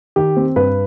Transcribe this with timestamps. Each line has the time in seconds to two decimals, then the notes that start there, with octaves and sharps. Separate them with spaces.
0.16 D#3 G4
0.37 C4
0.56 G2 B4